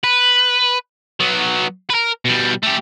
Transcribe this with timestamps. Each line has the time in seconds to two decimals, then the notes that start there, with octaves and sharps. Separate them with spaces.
0.04 B4
1.20 F#3 B3
1.90 A#4 B4
2.25 B2 G3
2.63 A3 G4